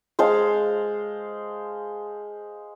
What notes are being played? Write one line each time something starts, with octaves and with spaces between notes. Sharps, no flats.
G#3 C5 F5 A5